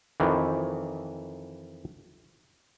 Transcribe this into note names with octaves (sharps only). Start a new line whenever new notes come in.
F2 D#3 E3